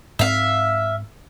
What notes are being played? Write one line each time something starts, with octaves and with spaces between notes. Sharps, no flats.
G#2 C4 E5 F5